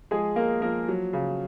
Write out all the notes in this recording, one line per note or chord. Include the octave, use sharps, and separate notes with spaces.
F3 G#3 G#4
G#3 A#3 A#4
F3 A#3 A#4
F#3
C#3